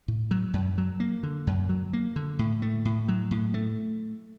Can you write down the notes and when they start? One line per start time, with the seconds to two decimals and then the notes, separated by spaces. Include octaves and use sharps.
0.08 A2
0.31 F#3
0.53 F#2
0.78 F#3
1.00 A#3
1.23 D3
1.47 F#2
1.69 F#3
1.93 A#3
2.16 D3
2.39 A2
2.62 A3
2.85 A2
3.08 F#3
3.31 A2
3.54 A3